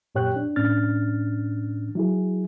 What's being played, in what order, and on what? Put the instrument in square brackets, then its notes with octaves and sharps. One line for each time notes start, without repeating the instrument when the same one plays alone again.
[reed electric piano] F#2 A#2 G4 C#5 G5 F#6
D4
A2 C#4 D4 F6 A6
F#3 E4 G#4